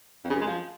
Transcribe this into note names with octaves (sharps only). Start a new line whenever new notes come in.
F2
C#3
F#2
G#3
F3